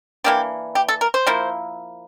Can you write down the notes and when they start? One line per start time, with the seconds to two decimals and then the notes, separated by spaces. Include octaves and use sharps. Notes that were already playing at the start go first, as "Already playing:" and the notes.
0.24 E3 A#3 D4 G4
0.75 G4
0.88 A4
1.01 A#4
1.14 C5
1.27 F3 A#3 E4